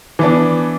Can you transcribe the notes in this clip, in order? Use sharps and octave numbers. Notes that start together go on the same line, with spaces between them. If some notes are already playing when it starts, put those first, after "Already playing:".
E3 B3 D4